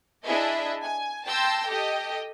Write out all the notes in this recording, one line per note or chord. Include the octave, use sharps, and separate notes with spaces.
D4 E4 G#4 D#5 E5
G#5
G5 A5 C6 E6 G6 A#6
G4 A4 D#5 G5